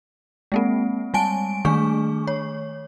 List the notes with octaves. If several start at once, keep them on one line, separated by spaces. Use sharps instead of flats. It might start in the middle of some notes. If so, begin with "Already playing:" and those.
G#3 A#3 C4
G3 G#3 G#5 A5 D7
D#3 A3 D4 G#4 C#6
C#5